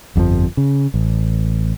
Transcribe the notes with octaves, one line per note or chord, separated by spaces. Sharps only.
G1 F2 B2 F3
C#3
A1